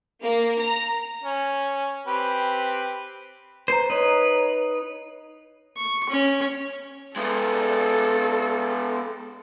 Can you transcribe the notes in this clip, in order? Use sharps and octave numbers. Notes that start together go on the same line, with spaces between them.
A#3
A#5
C#4
C4 G4 B4
B4 C5 A#5 C7
D#4 B4 C#5
C#6
C#4
G#3 B3 A4